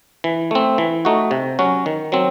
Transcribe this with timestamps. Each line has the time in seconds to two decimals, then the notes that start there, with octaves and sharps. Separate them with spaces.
0.24 E3
0.51 A3 C4
0.78 E3
1.05 A3 D#4 F#4
1.31 C3
1.59 F#3 C#4 F#4
1.86 D#3
2.12 F#3 C4